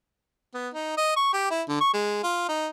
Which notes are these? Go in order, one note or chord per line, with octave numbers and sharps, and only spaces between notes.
B3
D#4
D#5
C#6
G4
E4
D3
C#6
G#3
F4
D#4